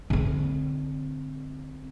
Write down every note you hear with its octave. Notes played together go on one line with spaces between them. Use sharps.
D3 C4